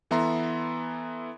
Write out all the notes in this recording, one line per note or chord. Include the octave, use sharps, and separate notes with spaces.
E3 B3 A4 E5 A#5 C6